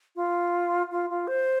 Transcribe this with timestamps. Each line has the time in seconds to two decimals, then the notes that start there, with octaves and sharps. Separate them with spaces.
0.16 F4
0.91 F4
1.10 F4
1.27 C5